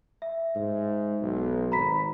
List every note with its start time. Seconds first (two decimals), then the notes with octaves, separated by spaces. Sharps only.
0.22 E5
0.55 G#2
1.21 B1
1.72 G#1 A#5 B5 B6